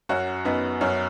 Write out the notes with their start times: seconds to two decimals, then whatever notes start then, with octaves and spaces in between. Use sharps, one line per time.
0.09 F#2 C#4 F#4
0.45 F#2 B3 D#4
0.81 F#2 C#4